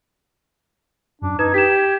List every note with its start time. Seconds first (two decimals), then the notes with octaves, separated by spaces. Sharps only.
1.21 F#2 D4
1.39 D#4 B4 G#6
1.54 G4 B6 E7